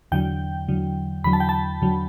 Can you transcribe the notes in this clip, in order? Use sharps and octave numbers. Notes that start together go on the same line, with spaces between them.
E2 D3 F#3 G5
E2 D3 F#3
E2 D3 F#3 B5
A5
G5
A5
E2 D3 F#3